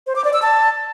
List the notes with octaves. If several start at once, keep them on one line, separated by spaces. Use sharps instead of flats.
C5
D6
D5
E6
A5